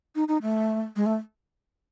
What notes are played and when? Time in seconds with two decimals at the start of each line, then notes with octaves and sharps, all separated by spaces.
0.15 D#4
0.28 D#4
0.42 A3
0.96 G#3
1.06 A3